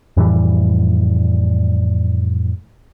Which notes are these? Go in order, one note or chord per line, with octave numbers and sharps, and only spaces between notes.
F2 A2 E3 G3